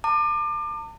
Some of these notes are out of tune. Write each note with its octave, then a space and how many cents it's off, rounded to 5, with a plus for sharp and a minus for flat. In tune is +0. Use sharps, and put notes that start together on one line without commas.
A5 +45 D6 +30